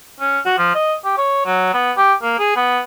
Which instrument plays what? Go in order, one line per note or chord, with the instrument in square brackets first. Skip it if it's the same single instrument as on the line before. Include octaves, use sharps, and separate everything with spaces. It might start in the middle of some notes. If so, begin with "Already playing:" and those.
[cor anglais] C#4
F#4
F3
D#5
G4
C#5
F#3
B3
G4
A#3
G#4
B3